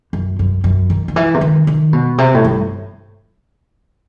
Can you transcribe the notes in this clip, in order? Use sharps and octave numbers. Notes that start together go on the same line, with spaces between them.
F#2
F#2
F#2
D#3
D#3
E3
C3
D#3
D#3
B2
C3
A2
G2